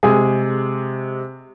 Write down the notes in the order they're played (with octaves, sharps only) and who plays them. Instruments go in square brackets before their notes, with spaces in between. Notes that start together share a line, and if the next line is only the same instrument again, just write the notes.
[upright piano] C3 G#3 G#4